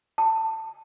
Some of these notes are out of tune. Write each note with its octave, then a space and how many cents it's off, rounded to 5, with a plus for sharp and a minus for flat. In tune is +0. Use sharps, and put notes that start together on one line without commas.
A5 +20